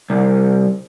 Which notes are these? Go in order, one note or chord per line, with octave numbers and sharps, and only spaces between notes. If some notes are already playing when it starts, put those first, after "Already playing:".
C2